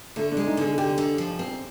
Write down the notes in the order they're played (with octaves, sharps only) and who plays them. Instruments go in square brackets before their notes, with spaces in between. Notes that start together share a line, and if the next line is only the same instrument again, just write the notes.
[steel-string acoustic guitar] D3 [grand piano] A3
[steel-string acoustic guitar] G#3 [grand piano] D4
[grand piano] D#4
[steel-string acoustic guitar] D3
[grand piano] G#4
[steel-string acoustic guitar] D3 [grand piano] G4
[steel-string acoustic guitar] D3
F3
C4